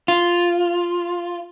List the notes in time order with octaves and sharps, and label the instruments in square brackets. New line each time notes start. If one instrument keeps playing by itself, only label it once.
[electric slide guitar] F4